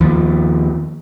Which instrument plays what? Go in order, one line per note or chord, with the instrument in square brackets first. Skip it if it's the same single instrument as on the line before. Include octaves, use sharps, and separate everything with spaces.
[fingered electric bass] D#2 F3